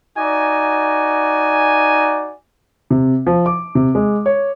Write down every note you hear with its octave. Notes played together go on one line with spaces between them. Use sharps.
D#4 F#4 D5 G#5
C3
F3
D6
C3
G#3
C#5